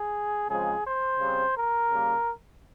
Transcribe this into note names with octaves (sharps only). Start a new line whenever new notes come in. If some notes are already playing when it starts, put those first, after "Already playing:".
Already playing: G#4
C#3 F3 G#3 C4 G#4
C5
C#3 G3 C4
A#4
C#3 G3 A#3